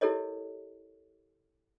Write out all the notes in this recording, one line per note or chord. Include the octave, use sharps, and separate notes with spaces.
E4 G4 A4 A#4 C#5 D#5